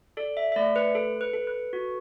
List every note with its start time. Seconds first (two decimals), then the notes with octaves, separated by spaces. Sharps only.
0.17 A4 D5
0.37 E5
0.52 E5
0.56 A3 D5
0.76 B4
0.95 A4
1.21 B4
1.34 A4
1.47 B4
1.73 F#4